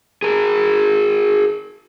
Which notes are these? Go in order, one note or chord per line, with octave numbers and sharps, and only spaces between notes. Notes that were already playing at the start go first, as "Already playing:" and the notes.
G#4 A#4